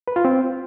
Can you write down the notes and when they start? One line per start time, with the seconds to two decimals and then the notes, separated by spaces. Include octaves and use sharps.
0.08 B4
0.16 F4
0.25 C4